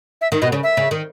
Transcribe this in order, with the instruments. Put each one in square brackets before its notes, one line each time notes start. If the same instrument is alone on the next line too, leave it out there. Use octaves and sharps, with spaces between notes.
[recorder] E5
[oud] D#3
[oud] B2 [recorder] D#5
[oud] C#3
[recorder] E5
[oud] C#3
D#3